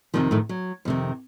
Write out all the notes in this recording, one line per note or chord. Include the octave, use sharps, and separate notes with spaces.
F2 C3 D#3 F3
A2 A3
F#3
F2 C3 D#3